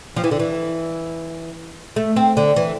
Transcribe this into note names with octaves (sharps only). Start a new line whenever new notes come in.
F3
E3
D3
E3
A3
C4
D3
E3